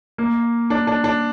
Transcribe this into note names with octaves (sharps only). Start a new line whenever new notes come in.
A#3
D4
D4
D4